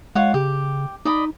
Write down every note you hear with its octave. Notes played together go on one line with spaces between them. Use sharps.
G#3 F4 C#5 F#5
C#3 G4
D#4 D5 D#5 B5